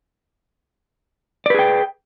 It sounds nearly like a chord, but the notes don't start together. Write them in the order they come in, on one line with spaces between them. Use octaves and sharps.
D5 B4 G#4 G5